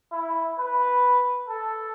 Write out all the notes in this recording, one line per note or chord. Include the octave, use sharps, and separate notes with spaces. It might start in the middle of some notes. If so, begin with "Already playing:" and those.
E4
B4
A4